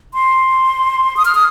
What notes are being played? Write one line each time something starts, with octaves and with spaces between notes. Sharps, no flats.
C6
D#6
F6
D#6